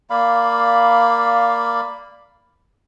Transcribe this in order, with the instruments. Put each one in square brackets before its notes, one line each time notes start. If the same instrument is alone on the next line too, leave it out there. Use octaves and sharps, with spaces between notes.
[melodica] A#3 D5 F5 B5